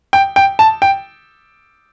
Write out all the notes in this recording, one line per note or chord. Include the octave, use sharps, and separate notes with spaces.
G5
G5
A5
G5